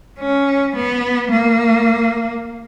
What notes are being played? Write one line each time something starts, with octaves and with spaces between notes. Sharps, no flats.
C#4
B3
A#3